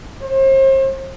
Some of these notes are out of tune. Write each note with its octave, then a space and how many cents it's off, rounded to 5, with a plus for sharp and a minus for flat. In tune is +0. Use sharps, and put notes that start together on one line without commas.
C5 +40